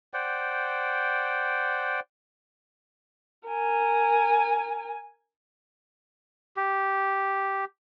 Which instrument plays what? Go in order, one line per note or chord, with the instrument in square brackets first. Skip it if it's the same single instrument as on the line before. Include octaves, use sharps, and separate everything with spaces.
[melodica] C5 D5 F#5 G5
[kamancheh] A#4 G#5
[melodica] G4